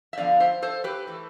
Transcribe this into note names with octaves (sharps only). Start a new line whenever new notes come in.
E5
D3 F3 B3 D4 D5 F5
C5 E5
A4 C5
G4 B4
E3 A3